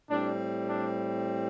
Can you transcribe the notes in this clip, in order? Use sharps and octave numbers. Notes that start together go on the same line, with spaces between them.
A2 G3 C4 D4
D4